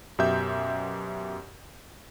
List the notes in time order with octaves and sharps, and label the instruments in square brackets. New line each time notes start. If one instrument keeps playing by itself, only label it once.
[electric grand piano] F#2 B2 G4 E5 G6